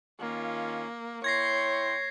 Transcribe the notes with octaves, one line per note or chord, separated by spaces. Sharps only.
D#3 A#3 C#4 F4
E4 C#5 G5 C6 G#6 A#6 C7